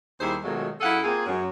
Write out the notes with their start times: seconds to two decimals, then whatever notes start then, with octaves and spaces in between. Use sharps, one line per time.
0.20 D#2 G3 D#4 E4 G#4 C5
0.42 B2 D#3 F3 F#3 G#3 A3
0.81 F#2 E4 G#4 A4 F5 F#5
1.03 A#3 C4 F4 G#4
1.26 F#2